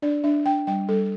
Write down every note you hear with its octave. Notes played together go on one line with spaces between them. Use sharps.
D4 D5
D4 E5
D4 G5
G3 G5
G3 A4